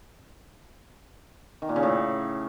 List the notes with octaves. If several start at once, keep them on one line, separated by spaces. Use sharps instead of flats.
D#3
A#2
C#3
A2